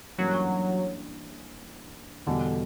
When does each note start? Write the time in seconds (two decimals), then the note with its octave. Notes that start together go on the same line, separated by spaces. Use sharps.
0.18 G2 E3 F#3 A#3 C#4
2.27 E2 B2 D3 G3